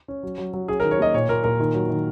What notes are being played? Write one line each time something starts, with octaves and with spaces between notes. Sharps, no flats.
C#4
F#3
F#3
F#3
C#4 G#4
A#4
D#3
C#5
A#3 D#5
A#2 C#5
A#2 A#4
A#2 A#4
D#3
F#3
D#3